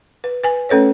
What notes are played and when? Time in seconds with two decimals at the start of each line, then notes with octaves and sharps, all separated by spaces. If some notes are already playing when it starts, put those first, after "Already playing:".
0.24 B4
0.44 B4 G#5
0.69 A3 C#4 A4 B4 C#5